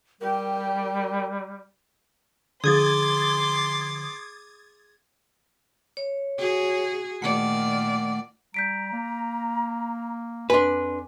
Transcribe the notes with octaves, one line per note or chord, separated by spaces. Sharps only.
G3 G4 A#4 G5
D3 F3 G#4 C6 D6 D#6 G#6 A6
C#5
F#4 G#4
A#2 D#3 A3 D5 F#5
G3 A#5 G6 B6 D7
A#3
F2 D4 B4 G#5 C6